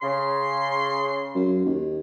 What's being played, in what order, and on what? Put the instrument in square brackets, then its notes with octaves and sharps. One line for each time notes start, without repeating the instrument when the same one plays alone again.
[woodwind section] C#3 [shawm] C6
[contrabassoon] F#2
D#2